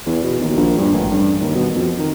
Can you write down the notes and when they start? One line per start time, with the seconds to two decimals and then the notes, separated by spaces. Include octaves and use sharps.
0.06 E2
0.24 B2
0.41 D#2
0.56 A#1
0.78 G2
0.92 A1
1.11 G2
1.41 D#2
1.55 B2
1.75 F2
1.99 D#3